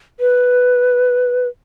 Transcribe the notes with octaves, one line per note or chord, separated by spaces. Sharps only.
B4